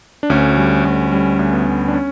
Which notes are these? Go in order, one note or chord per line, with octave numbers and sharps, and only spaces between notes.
D4
D2 C#4
G3
D2
G3 C#4
D2
B3
D2
D4
C#4